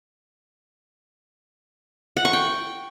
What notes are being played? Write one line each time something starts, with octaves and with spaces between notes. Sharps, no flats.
F#5
C#6
G5